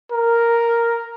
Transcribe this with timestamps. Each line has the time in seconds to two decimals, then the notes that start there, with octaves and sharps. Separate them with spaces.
0.12 A#4